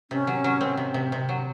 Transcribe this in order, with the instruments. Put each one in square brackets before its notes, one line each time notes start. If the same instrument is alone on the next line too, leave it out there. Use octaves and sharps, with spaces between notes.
[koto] C3 [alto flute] C#4
[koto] F#3
F#3
C4
C3
C3
C3
F#3